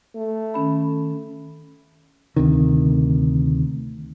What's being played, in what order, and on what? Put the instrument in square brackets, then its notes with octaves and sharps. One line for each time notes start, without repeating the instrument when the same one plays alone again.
[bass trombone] A3
[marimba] D#3 C#4 B5
[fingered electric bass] D2 C3 D#3